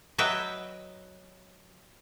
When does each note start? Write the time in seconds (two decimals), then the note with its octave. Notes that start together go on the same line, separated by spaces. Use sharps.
0.18 F#3 F#4 B4 D#5 E5 G5